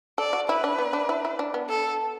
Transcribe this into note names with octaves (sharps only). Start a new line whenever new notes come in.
A4 D5
F#4
E4 B4
D4
B3
D4
E4
E4
D4
B3
A4